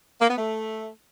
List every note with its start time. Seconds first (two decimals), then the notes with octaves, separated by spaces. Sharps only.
0.20 A#3
0.29 B3
0.38 A3